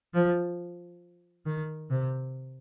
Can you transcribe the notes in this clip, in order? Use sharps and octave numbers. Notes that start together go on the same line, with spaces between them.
F3
D#3
C3